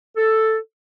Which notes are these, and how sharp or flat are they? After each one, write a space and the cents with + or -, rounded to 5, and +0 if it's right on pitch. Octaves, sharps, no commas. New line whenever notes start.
A4 +5